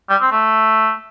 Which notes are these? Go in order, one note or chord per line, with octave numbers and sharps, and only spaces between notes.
G3
C4
A3